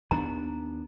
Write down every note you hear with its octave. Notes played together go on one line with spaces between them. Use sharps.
D#2 B3 D4 A#5